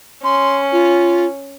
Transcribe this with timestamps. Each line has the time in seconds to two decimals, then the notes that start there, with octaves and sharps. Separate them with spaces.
0.24 C#4 C6
0.72 F4